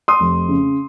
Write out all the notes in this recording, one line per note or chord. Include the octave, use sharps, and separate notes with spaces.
C6 D#6
F1
C#3